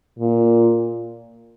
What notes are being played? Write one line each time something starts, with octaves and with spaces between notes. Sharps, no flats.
A#2